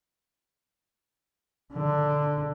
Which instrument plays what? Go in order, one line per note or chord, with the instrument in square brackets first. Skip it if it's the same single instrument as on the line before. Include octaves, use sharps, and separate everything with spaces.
[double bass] D3